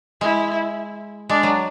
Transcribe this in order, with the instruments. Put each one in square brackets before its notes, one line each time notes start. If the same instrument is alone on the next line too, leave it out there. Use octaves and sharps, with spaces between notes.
[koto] G#3 [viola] E4
[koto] G#3 [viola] D4
[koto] F#3